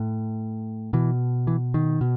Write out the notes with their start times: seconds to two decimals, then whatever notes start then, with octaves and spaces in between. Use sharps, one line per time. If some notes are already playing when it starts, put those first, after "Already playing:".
Already playing: A2
0.93 B2 E3
1.47 E3
1.74 D#3
2.01 B2